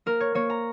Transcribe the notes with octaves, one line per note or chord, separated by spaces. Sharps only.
A#3 A#4
C#5
A#3 C#5
A#5